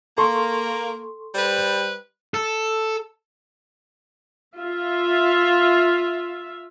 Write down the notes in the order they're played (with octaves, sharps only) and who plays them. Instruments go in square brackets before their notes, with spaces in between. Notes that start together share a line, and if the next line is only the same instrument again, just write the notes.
[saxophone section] A#3 [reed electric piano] A4 C6 C#6
[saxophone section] G3 B4 C5
[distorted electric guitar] A4
[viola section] F4 E5